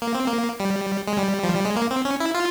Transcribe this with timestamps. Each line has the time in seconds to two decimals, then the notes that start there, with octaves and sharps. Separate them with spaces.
0.02 A#3
0.14 C4
0.28 A#3
0.60 G3
1.07 G#3
1.18 G3
1.44 F3
1.55 G3
1.65 G#3
1.76 A#3
1.91 C4
2.05 C#4
2.20 E4
2.35 F4